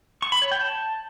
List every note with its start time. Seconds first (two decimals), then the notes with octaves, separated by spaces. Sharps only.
0.22 C#6
0.32 B5
0.42 C#5
0.51 G5
0.61 A5